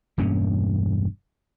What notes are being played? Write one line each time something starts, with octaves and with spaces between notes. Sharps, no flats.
E1 G2 A#3 C#4